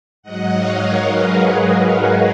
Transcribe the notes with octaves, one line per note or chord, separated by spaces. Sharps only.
G#2 F#3 D#5 F#5
C#5 F5
A#4 C#5
G#4 B4
F#4 A#4